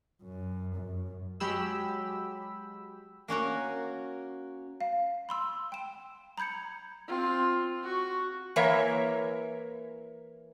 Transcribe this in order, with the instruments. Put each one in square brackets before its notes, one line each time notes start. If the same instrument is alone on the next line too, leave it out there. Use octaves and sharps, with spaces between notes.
[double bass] F#2
F#2
[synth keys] F#3 G#3 G4 B5 E6
[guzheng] A#3 C#4 F#4 A#4
[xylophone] F5
B5 C6 E6
G5 E7
A#5 B5 G6 G#6 C#7
[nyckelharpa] C4 F4
F#4 C#6
[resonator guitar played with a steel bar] E3 A#3 A#4 C#5 E5